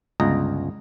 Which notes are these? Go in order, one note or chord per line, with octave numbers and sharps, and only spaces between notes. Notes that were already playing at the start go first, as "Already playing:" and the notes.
G1 C#2 D#5 A#5